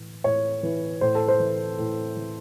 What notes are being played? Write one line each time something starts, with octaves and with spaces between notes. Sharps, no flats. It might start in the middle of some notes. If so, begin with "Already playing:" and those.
Already playing: A2 E3
A2 C#5
E3
A2 C5
A4
C5
E3
A2
E3